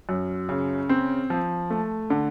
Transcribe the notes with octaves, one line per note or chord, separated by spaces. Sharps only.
F#2
C#3
C4
F3
A3
D3